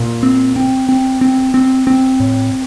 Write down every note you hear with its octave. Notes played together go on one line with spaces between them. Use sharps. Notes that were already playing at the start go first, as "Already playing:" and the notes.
Already playing: A#2
C4
C4
C4
C4
C4
C4
A2